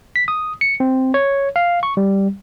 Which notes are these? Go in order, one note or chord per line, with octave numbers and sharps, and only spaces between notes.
B6
D#6
C#7
C4
C#5
F5
C#6
G3